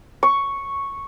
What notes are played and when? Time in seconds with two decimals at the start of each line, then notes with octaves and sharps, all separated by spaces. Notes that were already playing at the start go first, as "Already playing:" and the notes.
0.23 C#6